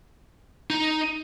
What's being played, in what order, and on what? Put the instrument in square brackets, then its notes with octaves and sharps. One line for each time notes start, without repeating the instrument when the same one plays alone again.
[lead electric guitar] D#4